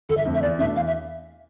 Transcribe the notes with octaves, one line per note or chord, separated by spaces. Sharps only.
G1 A4
E5
F2 D3 A3 C4
E5
E2 D5
B2 A3 D4 E5
E2 F5
E5